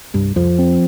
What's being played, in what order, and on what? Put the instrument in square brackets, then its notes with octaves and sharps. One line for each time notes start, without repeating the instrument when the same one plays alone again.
[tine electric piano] C2 [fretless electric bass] G2
[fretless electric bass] F2 [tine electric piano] F3
[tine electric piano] C4